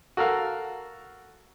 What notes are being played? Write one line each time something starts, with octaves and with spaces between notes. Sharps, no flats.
F#4 A4 A#4 F5